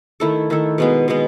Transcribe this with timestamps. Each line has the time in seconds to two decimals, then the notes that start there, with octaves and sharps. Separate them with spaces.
0.20 D#3 A3 E4 A4
0.50 D#3 A3 E4 A4
0.78 B2 G#3 B3
1.08 B2 G#3 B3